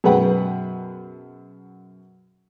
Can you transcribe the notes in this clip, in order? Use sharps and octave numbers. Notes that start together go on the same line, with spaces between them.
F#2 B2 G#4 B4 F#5 G5